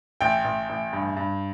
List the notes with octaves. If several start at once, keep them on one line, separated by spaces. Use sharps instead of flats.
A1 G5
A1
A1
G2
G2